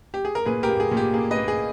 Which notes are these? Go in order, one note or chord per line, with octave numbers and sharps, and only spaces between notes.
G4
G#4
A#4
A#2 G#4 B4
G4 A#4
A#3
G#4
A#2
G4
A#3 G#4
B4 D#5
A#3
G#4